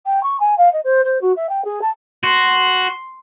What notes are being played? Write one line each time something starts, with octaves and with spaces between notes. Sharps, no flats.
G5
C#6
G#5
F5
D#5
C5
C5
F#4
E5
G5
G#4
A5
F#4 C6